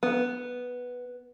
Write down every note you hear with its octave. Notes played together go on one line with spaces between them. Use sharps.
B3